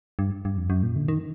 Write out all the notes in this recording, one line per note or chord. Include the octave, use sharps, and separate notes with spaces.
G2
G2
F2
F#2
A#2
D3
D#3